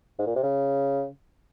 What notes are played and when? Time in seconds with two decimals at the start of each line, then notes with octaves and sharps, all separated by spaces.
0.19 G#2
0.27 A#2
0.36 C3
0.43 C#3